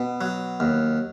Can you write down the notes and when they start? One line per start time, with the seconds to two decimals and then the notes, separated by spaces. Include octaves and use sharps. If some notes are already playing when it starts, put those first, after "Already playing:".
Already playing: B2
0.21 F#3
0.60 D#2